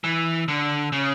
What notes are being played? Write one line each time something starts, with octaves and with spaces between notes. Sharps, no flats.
E3
D3
C#3